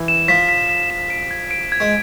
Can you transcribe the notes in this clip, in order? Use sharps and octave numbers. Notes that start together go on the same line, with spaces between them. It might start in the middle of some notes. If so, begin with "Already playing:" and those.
Already playing: E3
E7
F3 B6
B6
B6
E7
D7
G#6
D7
G#6
G#3